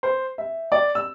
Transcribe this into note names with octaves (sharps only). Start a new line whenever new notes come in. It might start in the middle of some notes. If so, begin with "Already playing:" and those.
C5
E5
D5
E6